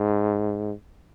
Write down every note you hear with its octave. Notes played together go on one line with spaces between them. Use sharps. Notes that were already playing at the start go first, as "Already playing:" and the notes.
Already playing: G#2